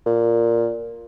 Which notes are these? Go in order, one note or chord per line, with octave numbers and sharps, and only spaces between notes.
A#2